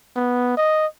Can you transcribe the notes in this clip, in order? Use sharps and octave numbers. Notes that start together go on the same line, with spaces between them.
B3
D#5